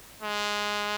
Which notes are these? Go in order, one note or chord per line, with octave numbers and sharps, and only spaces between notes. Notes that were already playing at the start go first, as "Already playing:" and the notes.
G#3